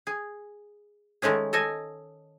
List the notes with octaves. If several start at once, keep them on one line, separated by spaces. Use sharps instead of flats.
G#4
D#3 G#3 A3 C#4 G#4
A4 D#5 G#5